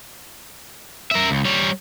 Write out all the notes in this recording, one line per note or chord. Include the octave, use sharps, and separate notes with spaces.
A#4 E5
C#2
G3 C#5